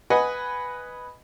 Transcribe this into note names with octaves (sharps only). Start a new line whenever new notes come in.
B4 D#5 F#5 G#5